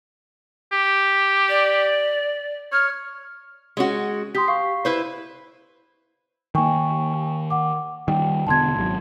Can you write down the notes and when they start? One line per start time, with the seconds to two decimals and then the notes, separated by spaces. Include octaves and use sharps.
0.72 G4
1.48 D5
2.72 C#5 F6
3.77 G#3 C#4 F#4
4.35 G4 C6 D#6 B6
4.48 F5 C#6 C7
4.85 E4 B4 C5
6.55 D#3 A#3 G5 G#5 C#6
7.50 F#5 D6
8.08 D#3 G3 G5
8.47 E1 D3 B3 A5 C6 G#6
8.76 G#1 F#3